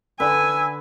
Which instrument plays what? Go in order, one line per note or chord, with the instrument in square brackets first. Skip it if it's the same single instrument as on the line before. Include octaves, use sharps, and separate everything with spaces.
[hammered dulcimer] D3 B4 [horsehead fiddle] G#5 [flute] E6